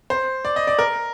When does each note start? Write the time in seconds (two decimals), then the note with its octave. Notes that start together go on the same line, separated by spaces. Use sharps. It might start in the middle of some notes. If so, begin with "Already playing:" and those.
0.10 C5
0.45 D5
0.56 D#5
0.67 D5
0.79 A#4